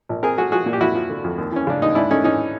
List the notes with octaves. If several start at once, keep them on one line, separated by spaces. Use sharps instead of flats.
A#1
C4 G#4 A#4
A3 F#4 G#4
F3 F#4 G#4
A#2
G4
F2 E4 F#4
F3
D3
F2
D#2
E3 C#4
C#3 D4
D#2 D#4
G#2 D4 E4
A3 C#4 D#4
E3 C#4 D#4